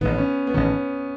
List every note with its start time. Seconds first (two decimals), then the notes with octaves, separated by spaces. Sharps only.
0.01 A1 G#2 D#3 B3
0.18 C#4
0.47 B3
0.54 A1 G#2 D#3 C#4